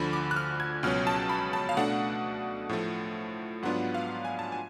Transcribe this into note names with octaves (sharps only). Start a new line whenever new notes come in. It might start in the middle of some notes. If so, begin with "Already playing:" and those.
Already playing: D2 D3 F3 B5
D6
F#6
F6
G#6
C#2 B2 F#3 C#4 F6
A5
B5
A5
F5
B2 A3 D4 F#5
A2 F3 A3
G#2 F#3 B3 D4 F4 F#5
F5
G#5
A5
G#5